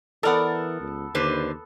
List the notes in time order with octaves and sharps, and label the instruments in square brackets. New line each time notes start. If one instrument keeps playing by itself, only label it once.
[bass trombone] E3 [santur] B3 A4 [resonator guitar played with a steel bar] A#4 D5 F#5
[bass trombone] C#2
[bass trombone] D#2 [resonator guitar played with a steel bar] D3 B4 C5